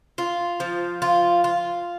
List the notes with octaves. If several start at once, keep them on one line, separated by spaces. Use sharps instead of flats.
F4
F3
F4
F4